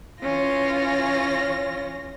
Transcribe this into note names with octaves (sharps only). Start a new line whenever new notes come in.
E3 C#4 F4 A#6